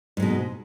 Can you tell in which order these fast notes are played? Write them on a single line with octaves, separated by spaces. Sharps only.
G#2 G#3 B2